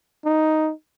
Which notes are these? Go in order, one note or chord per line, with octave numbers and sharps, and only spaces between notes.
D#4